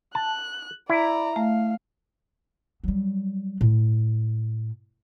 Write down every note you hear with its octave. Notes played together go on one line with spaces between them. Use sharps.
A5 F#6
E4 D5 A#5
A3 F5
F#3 G3
A2